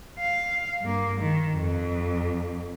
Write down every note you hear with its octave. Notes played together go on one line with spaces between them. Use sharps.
F5
G2 A#3
D#3
F2